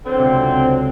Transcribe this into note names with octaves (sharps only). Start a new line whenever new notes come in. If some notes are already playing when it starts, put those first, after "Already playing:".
D3 F#3 C4
C#2 C3